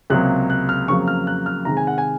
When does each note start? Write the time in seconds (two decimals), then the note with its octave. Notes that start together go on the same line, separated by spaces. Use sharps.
0.10 C#2 C3 F#3 A#3 F#6
0.50 F#6
0.69 F6
0.88 F2 C#3 F#3 A#3 C#6
1.08 F6
1.27 F#6
1.46 F6
1.65 C3 D#3 G#3 A#5
1.77 G#5
1.87 F#5
1.98 G#5